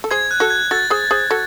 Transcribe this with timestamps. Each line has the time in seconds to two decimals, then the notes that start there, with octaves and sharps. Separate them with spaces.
0.04 A4
0.11 G#4 C5 G#6
0.31 F#6
0.40 F#4 A4
0.50 G#6
0.71 F#4 A4 A6
0.90 G#4 C5
1.11 G#4 C5
1.30 F#4 A4